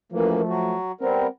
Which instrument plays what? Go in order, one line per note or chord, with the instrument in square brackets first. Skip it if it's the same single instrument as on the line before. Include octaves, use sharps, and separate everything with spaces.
[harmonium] F#2 E3 A#3 [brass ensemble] F3 A3
[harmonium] F#3 F#4
[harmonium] G3 B3 A#4 [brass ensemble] C4